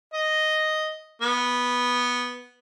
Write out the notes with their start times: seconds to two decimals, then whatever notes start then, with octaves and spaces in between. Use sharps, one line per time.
0.14 D#5
1.22 B3